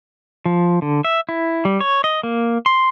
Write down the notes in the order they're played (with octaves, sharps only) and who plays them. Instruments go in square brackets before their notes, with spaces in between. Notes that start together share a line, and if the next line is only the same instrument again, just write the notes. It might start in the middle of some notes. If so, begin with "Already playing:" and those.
[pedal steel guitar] F3
D3
E5
E4
G3
C#5
D#5
A#3
C6